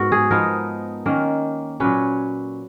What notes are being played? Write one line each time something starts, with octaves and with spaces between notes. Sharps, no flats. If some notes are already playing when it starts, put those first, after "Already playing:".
Already playing: G#2 B3 F#4 A#4
G#4
F3 B3 D#4 A#4
D#3 A#3 C#4
A#2 F#3 C#4 B4